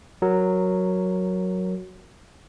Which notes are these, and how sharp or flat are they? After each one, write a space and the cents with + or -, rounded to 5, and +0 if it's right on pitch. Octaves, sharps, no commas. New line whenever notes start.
F#3 +0 A#4 +0